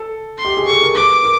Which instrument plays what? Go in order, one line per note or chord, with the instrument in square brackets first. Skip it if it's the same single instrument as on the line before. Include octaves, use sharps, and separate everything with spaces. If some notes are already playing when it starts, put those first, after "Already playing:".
Already playing: [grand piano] A4
[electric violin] C6
[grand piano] G4
G#4
[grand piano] A4 [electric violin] C#6
[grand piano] A#4
[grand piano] B4 [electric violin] D6
[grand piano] A#4